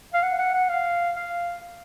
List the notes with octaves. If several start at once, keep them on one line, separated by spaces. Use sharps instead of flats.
F5
F#5
F#5
F#5
F5
F5